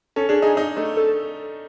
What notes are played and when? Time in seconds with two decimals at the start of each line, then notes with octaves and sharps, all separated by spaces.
0.16 C#4 A4
0.29 D4 G#4
0.42 D#4 G#4
0.57 D#4
0.77 A3
0.97 A4